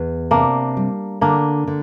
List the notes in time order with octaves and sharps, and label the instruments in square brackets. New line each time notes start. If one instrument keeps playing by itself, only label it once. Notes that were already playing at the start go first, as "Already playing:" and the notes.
Already playing: [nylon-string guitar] E2
[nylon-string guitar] C3 [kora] A#3 D4
[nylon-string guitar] G3
[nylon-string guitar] D3 [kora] A#3 D4
[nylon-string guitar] D3